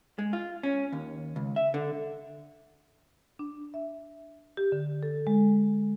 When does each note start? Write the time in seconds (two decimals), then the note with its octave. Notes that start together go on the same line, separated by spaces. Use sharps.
0.18 G#3
0.33 F4
0.63 C#4
0.92 D#2
1.36 C#2
1.56 E5
1.74 D3
3.39 D4
3.74 E5
4.57 G4
4.72 D3
5.03 A4
5.27 G#3